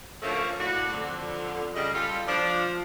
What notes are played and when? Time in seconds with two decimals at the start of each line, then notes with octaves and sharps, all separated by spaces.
0.22 D3 F3 A3 A#3 C#4 F#4
0.58 A2 F#4 D5
0.92 F2 D3
1.74 C#3 G3 D#5
1.94 G3 F4 A4
2.27 F3 D4